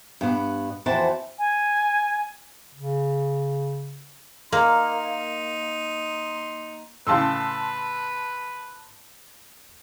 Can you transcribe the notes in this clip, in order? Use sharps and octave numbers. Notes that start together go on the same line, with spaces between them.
G2 B3
F2 E3 F#4 C5 G5 A5
G#5
C#3
A#3 D#4 C6
A2 C#3 B4 A5 C6 E6